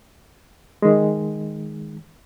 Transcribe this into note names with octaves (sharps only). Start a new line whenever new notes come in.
D#3 G#3